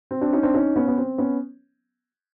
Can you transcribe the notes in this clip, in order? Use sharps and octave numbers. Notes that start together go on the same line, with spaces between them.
C4
C4 D4
C#4 D#4
C4 D4
C#4 D#4
B3 C#4
B3
C4
B3 C#4